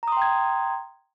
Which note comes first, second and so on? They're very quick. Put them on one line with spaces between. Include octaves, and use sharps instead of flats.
A#5 D#6 C6 G5 G#6